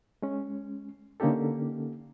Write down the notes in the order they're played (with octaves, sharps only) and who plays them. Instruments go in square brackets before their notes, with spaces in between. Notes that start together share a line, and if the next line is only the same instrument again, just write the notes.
[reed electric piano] G#3 C#4
D3 A#3 C#4 D#4 G4 A4